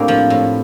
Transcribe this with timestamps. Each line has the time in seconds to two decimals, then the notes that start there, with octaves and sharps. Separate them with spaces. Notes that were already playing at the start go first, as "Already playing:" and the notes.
Already playing: A2 A#3 C4 D4 G4
0.08 F3
0.30 A2